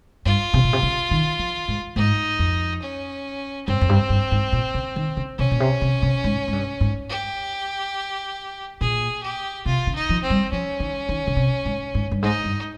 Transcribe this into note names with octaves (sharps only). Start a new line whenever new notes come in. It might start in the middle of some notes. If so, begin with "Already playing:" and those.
G2 F4
C3
A#2
C3
C#3
D#3
F3
G#2
G#2 D#4
F2
C#4
G2 C4
F2
G2
G2
G#2
A#2
C#3
D#3
C#3
C3 C#4
A#2
C3
C3
C3
G#2
G#2
G2
G#2
G4
A#2 G#4
G4
C3 F4
C#3
D#4
F3
C4
G3
F3 C#4
D#3
D#3
C#3
C3
G#2
G#2
G2
G#2 D#4
G2